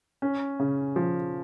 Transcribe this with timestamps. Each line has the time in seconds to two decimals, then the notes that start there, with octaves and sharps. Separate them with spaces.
0.22 C#4
0.60 C#3
0.96 F3